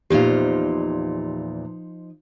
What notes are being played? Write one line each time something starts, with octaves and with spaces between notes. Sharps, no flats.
E2 A#2 F3 D#4 G4 C5 F5